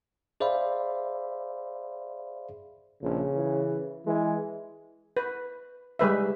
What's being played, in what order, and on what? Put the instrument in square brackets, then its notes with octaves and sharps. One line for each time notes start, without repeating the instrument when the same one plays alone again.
[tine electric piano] G#4 C5 D5 E5 F5 B5
[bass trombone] A#1 [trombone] C#3
[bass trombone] E3
[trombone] E3 [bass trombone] G#3
[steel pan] B4
G3 G#3 B4 E5